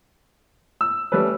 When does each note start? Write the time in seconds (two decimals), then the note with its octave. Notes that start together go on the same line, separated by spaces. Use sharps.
0.81 E6
1.12 G3 A3 C#4 B4